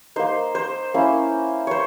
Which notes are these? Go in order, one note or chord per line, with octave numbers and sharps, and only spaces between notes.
A#3 D#4 C5
C5
A#3 C#4 E4
C5 C#5